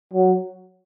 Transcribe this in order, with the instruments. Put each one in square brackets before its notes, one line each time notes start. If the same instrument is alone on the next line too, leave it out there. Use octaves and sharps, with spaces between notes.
[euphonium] F#3